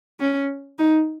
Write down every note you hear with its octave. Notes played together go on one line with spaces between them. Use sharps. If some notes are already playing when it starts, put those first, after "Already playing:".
C#4
D#4